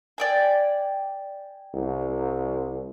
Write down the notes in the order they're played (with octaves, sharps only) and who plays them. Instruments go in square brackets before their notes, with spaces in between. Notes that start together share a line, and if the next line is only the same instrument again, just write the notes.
[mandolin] D5 G5 G#5
[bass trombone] C2